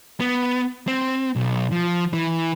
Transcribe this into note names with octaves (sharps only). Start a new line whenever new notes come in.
B3
C4
B1
F3
E3